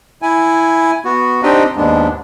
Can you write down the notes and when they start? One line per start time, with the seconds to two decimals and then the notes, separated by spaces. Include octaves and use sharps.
0.22 E4 G#5
1.05 B3 F#4
1.43 C4 D4 D#4 G4 D#5
1.77 D#2 G#2 G#3 B3 D4